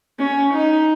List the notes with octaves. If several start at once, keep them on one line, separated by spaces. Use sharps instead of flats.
C#4
D#4